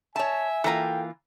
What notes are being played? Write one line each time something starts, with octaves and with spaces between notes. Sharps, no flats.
C#5 E5 G#5 A5
E3 A#3 F4 A4 G5 A#5